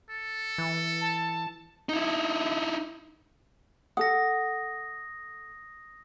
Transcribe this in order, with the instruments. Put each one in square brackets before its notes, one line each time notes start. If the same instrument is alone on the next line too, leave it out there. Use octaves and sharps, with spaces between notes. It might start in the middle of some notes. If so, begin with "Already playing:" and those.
[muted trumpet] A4
[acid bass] E3
[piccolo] A5
[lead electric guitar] D#4 E4
[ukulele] A4 F#5 [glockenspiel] D#6 A#6